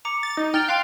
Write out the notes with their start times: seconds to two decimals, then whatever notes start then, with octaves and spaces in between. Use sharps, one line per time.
0.05 A#5 D6 C#7
0.23 A6
0.37 D#4
0.54 G5 F6 A6 F7
0.69 F5 G5 C6 F#6